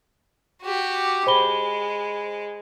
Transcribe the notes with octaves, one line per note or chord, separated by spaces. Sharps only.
F#4 G4
G#3 C5 B5 G7